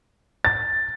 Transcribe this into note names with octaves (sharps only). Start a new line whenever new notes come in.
A6